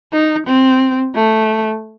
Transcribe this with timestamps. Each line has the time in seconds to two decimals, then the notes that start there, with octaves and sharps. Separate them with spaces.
0.12 D#4
0.47 C4
1.15 A3